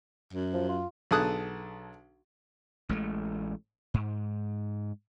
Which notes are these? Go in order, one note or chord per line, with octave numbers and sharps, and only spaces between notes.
F#2
F3
F4
B1 D3 G#4 A4 D#6 F#6
A1 G#3 A3
G#2